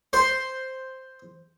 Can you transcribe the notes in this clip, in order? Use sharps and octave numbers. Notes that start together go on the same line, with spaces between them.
C5 C6